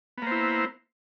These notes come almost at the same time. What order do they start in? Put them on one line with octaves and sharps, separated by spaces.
B3 A#3 C5 E4